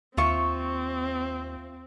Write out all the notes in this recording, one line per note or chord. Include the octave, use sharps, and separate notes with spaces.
D#2 C4 F4 E5 C#6